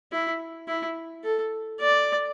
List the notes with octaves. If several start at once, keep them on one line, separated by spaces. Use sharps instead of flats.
E4
E4
A4
D5